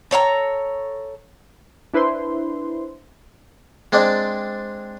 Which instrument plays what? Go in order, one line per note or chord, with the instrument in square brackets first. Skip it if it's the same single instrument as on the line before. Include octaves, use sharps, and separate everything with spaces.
[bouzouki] A4 C#5 F5 A#5
[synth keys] D4 E4 B4 C5 C6
[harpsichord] G#3 C4 D4 D5